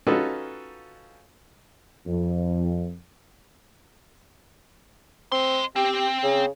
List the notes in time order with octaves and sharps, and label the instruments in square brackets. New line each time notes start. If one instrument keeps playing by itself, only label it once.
[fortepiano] C#4 D#4 F4 F#4 A4 B4
[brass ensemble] F2
[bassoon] C4 [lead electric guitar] D#5 C6
[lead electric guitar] C4 [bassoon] G4
[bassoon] C#3